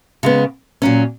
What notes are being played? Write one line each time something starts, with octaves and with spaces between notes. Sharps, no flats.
C#3 G#3 B3
A#2 F#3 C#4